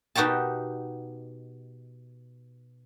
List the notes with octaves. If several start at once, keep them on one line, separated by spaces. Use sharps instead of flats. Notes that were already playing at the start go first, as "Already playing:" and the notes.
B2 D#4 F#4 G4 A5